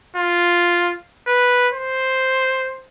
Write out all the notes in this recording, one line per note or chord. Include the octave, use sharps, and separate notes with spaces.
F4
B4
C5